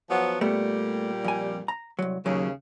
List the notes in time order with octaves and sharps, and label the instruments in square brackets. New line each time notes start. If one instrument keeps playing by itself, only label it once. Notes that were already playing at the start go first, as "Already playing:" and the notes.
[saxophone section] F3 F#3 B3
[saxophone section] A#2 G3 [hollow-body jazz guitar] A3 B3
[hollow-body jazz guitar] F2 G#5
A#5
C2 F#3
[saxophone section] D#2 C#3 [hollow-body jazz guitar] F#3